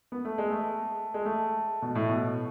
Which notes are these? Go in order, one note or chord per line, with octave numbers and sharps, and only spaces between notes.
B3
A3
G#3
A3
G#3
A3
B2
A2
B2